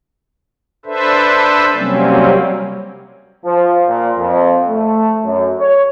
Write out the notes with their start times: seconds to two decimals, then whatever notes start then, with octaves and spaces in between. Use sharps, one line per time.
0.86 D4 A4 B4 C5 E5
1.76 C3 F#3 G3 A#3 C4 C#4
3.44 F3
3.87 A#2
4.18 F2
4.68 A3
5.24 F#2
5.60 C#5